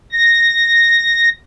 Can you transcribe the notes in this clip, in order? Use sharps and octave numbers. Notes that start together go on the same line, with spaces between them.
A#6